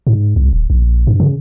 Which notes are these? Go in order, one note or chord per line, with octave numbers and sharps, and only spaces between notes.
G#2
C2
D1
A#1
G2
C#3